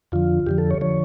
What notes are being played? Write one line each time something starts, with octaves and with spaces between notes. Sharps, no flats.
F2 D3 F3 F4
F2 D3 F3 G4
A4
C#5
D3 F3 C#5